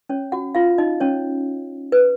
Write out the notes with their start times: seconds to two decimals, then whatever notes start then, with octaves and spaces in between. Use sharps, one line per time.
0.09 C#4 C#5
0.32 F#4 F#5
0.55 F4 F5
0.78 D#4 D#5
1.00 C#4 C#5
1.92 B4